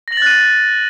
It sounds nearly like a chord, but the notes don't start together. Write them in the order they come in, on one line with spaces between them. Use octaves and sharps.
A#6 F#7 A6 F#6 D#7